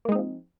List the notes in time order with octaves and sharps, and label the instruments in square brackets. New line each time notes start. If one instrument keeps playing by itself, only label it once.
[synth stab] A#3
G#3
D#4
C4
F3